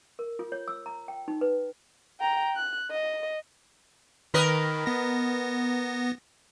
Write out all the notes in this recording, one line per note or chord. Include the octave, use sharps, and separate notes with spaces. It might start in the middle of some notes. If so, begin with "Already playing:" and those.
A#4
F4
C#5
E6
A#5
G5
D#4
B4
G5 A#5
F#6
D#5
D#3 A#4 B4 D#5
B3 A#6